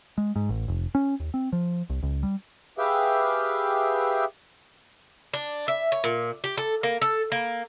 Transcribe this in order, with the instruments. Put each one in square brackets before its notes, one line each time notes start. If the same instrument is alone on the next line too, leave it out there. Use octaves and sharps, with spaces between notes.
[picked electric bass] G#3
G#2
A1
F1
C#4
D#2
C4
F3
C2
C#2
G3
[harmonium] G4 G#4 B4 E5 F5 G5
[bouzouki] D4
E5
C#5
A#2
G4
A4
A#3
A4
A#3